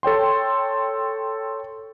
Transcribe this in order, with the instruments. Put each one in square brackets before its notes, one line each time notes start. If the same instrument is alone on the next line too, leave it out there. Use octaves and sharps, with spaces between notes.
[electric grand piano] A4 C#5 G5 C6